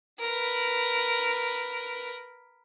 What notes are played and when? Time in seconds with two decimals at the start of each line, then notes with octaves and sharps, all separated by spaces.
0.20 A#4 B4